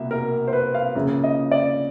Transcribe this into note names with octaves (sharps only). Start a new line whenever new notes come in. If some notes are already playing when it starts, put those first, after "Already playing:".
Already playing: C2 B2 A#3 E5
A#4
C5
B4
F5
C#2 C#3 F3 A#3 E5
D#5
D5